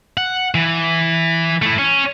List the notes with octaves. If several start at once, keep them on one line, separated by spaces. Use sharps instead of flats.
F#5
E3
A3 E4
C#4